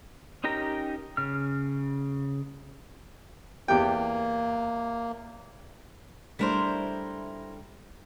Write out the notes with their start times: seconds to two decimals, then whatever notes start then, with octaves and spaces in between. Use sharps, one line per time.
0.44 C#4 D#4 G4 A#4 A#5
1.17 C#3 F6
3.68 E2 A#3 G4 G5
6.39 G3 A3 D4 E4 A#4 C5